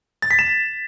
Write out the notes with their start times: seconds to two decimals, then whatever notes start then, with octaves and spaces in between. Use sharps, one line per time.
0.22 A6
0.31 B6
0.39 E7